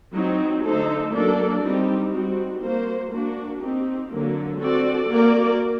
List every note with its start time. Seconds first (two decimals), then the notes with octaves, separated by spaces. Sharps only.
0.14 F#3 C4 D#4
0.63 D3 A3 D#4 A4 C5
1.14 F#3 A#3 D4 A4 D5
1.63 G3 C4 D#4 G4
2.13 G3 C4 D#4 F#4
2.62 A#3 F#4 C5
3.12 A#3 D4 F#4
3.61 C4 D#4 G4
4.10 D3 F#3 A#3
4.60 C4 F#4 A4 D5
5.09 A#3 F#4 A#4 D5